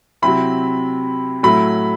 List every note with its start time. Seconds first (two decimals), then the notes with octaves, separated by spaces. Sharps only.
0.22 C3 F#3 C4 E4 B5
1.43 A2 F#3 A3 E4 B5